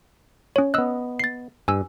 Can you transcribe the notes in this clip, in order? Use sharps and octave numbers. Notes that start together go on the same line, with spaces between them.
C#4 C#5
B3 D#5 E6 F#6
A6 C7
G2 G#5 E6